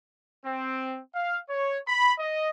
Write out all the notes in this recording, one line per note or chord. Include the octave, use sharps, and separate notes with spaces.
C4
F5
C#5
B5
D#5